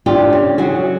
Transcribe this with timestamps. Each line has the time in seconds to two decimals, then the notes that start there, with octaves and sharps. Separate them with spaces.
0.06 D4 F4 G4
0.33 C#3
0.58 F#3 F#4 G#4